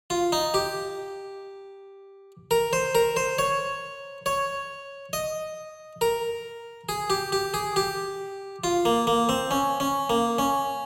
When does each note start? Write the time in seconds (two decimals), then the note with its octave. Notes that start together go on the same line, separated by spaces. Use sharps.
0.10 F4
0.32 D#4
0.54 G4
2.51 A#4
2.73 C5
2.95 A#4
3.16 C5
3.39 C#5
4.26 C#5
5.13 D#5
6.01 A#4
6.89 G#4
7.10 G4
7.32 G4
7.54 G#4
7.76 G4
8.64 F4
8.85 A#3
9.07 A#3
9.29 C4
9.51 C#4
9.80 C#4
10.10 A#3
10.39 C#4